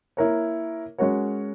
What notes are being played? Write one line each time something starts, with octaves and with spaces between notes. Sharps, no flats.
A#3 E4 A#4 C#5
G#3 C#4 F#4 A#4 C#5